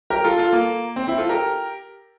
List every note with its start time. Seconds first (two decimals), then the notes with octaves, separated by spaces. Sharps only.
0.10 G4 A#4
0.24 F4 A4
0.38 F4 A4
0.53 A#3
0.96 C4
1.07 C4 E4
1.18 F4 A4
1.29 G4 A#4